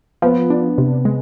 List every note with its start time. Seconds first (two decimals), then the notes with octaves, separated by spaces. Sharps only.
0.22 F3 B3
0.50 D4
0.78 C3
1.05 G#3